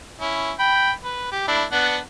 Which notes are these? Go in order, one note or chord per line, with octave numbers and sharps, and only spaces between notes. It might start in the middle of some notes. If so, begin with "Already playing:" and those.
C#4 E4
G5 B5
B4
G4
A3 D4 E4
B3 D4 F#5